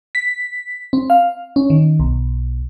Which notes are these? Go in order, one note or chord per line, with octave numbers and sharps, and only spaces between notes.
B6
C4
F5
C#4
D#3
B1